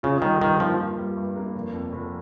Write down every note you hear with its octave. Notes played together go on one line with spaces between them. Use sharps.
C#3 F4
D#3 G3
G2 D#3
F3 A#3
F4
G3
G2
A#3
F1
F2
F1